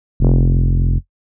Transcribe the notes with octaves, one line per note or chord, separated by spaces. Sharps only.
F1